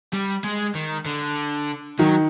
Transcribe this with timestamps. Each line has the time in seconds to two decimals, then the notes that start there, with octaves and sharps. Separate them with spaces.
0.13 G3
0.44 G#3
0.75 D#3
1.06 D3
1.99 D#3 F#3